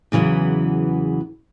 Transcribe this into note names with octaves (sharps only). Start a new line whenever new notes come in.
E2 C#3 E3 F#3 B3